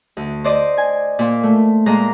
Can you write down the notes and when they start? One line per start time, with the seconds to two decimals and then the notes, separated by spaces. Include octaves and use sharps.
0.17 D2
0.44 C5 D5 D#5
0.78 G#5
1.19 A#2
1.43 A3
1.86 A#2 G#3 A#5